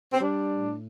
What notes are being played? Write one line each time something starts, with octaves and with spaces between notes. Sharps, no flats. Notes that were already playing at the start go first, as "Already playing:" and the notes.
C4
G3 D4
A2